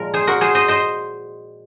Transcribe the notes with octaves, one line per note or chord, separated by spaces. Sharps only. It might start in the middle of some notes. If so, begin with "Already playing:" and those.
Already playing: A#2 F3 G#3 A#4
G#4 C5
F#4 A#4
G#4 C5
C5 D#5
C5 D#5